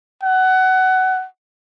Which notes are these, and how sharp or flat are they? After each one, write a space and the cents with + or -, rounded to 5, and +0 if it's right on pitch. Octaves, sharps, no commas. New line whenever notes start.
F#5 +20